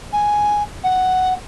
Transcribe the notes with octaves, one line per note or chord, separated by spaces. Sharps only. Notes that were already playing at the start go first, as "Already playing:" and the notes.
G#5
F#5